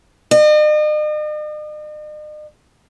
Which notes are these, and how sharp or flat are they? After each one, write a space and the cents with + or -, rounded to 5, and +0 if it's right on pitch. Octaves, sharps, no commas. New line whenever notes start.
D#5 -45